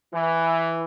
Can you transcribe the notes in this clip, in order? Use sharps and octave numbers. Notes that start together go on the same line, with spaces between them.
E3